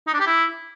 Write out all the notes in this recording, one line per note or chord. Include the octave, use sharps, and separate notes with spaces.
D#4
D4
G4
E4